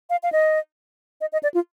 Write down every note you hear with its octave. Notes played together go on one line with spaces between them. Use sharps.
F5
F5
D#5
D#5
D#5
D5
F4